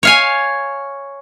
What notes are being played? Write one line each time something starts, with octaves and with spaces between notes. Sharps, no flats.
C#5 F5 G#5